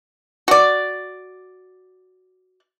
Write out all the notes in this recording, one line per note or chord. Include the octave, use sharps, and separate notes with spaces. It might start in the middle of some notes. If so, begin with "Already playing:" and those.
F#4 D5